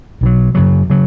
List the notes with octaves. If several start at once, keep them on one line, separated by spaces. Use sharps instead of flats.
B1 B2 F#3
F#2 C#3 F#3
C#3 F#3